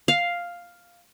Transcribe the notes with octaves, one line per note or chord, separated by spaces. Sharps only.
F5